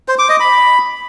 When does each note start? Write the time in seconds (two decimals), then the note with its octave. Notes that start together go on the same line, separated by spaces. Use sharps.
0.08 C5
0.19 D6
0.29 D#5
0.40 B5